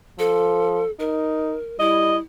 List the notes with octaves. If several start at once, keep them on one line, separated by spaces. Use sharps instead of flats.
F3 A4
D#4 A#4
G3 E4 D#5